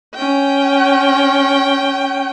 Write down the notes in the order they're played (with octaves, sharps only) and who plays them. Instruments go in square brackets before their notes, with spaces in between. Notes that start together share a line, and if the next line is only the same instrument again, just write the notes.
[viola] C#4 G5